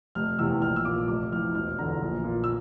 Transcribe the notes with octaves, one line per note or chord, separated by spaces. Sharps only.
F1 F6
E2 C3 E3 E6
A#1 F6
E6
A#2 D6
F1 D6
F2 E3 F6
E1 F6
E2 D3 A#5
A#1
A#2
E6